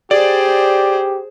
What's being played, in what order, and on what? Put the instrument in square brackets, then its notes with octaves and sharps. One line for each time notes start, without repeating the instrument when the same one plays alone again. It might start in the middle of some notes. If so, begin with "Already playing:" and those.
[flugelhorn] G4 [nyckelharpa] G#4 C5 [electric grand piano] D5